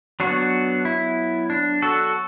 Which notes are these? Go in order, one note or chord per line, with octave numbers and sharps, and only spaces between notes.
F#3 B3 D4 F#4
E4
D4
F#4 A4